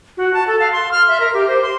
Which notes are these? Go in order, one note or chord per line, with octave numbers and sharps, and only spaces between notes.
F#4
A5
A4
F5
C6
F6
E5
A#4
G4
C5
C6